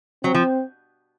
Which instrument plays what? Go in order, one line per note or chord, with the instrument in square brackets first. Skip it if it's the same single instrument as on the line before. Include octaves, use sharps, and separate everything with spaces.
[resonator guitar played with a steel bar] F#3 [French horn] C4
[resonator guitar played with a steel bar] F3